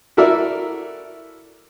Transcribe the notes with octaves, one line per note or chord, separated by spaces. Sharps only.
E4 F#4 A4 A#4 D5 E5